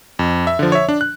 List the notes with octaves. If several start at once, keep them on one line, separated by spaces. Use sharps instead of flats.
F2
E5
D3 F3
C#5 E5
D4
F#6